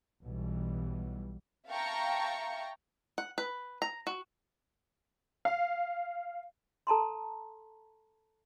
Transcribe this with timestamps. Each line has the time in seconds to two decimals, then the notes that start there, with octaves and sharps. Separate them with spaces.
0.23 B1 B2 E3 G3
1.68 E5 F5 G5 A5 A#5 C#6
3.18 F#5
3.38 B4
3.82 A#5
4.07 F#4
5.45 F5
6.87 A4 A5 A#5 C6